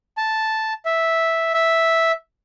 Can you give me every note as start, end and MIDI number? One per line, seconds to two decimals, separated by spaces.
0.17 0.73 81
0.85 1.54 76
1.54 2.12 76